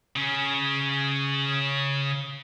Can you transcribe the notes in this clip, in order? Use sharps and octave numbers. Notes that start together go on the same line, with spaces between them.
C#3 C#4